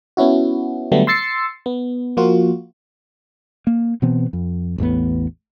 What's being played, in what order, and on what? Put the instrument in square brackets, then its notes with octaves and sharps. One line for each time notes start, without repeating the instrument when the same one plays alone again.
[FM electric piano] B3 C#4 E4 F#4
D3 F#3 G3 A3 B3
C6 E6 A6 C7 C#7
B3
F3 A#3 F4 F#4
[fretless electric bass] A#3
B2 E3 B3 C4
F2
A1 E2 A2 B3